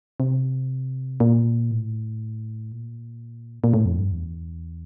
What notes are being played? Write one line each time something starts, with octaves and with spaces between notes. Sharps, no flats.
C3
A#2
A2
A#2
A#2
A2
F2
G2
E2